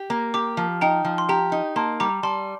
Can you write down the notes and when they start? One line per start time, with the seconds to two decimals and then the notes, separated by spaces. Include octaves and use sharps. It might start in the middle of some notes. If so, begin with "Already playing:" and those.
Already playing: G4
0.10 A#3
0.34 G4 A#5 D6
0.57 F3
0.81 D#4 G5 A#5
1.05 F3
1.18 C6
1.29 G4 G5 A#5
1.52 D#4
1.76 A#3 A5 C6
2.00 G3 A#5 D6
2.23 G3 A5 C6